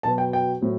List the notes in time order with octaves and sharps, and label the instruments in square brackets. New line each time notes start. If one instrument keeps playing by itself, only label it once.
[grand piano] B2 F#3 B3 A5
G5
G5
A2 F#3 C4